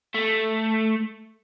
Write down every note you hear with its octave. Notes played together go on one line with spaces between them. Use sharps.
A3